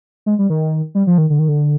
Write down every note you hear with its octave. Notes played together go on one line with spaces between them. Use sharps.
G#3
G3
D#3
G3
F3
D#3
D3
D#3
D3